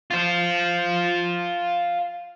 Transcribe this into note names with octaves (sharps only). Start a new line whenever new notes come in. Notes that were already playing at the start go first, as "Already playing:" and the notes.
F4 C5